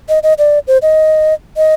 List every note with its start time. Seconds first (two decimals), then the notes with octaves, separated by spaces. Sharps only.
0.09 D#5
0.23 D#5
0.38 D5
0.67 C5
0.82 D#5
1.57 D#5